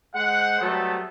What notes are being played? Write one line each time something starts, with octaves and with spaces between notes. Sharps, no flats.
G#3 G#4 C5 F#5
F#3 G3 A3 B3 C4 A4